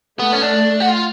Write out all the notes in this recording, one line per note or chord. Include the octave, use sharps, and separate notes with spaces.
A3 B3
C#4
D4
F#4
F4